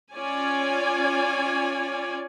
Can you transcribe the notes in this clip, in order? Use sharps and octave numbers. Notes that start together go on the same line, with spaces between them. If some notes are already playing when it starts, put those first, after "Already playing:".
C#4 F4 C#5 D5 G#5